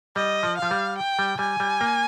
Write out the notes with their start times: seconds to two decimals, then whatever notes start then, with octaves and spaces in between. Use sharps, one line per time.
0.16 G3 D#5
0.43 F3
0.58 F3 F5
0.71 G3
0.98 G5
1.19 G3
1.39 G3 G#5
1.60 G3
1.81 A#3